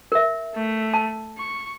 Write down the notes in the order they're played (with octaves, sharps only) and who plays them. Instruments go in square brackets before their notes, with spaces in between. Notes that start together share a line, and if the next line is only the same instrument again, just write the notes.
[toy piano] A#4 E5
[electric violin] A3
[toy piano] A5
[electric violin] C#6